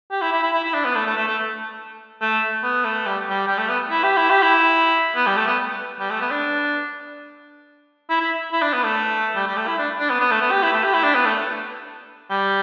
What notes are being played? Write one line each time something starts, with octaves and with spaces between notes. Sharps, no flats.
G4
E4
E4
E4
E4
E4
D4
B3
A3
A3
A3
A3
A3
B3
A3
G3
G3
G3
A3
B3
E4
G4
E4
G4
E4
B3
G3
A3
B3
G3
A3
B3
D4
E4
E4
E4
D4
B3
A3
G3
G3
A3
E4
D4
D4
B3
B3
A3
B3
G4
E4
A3
G4
E4
D4
B3
A3
G3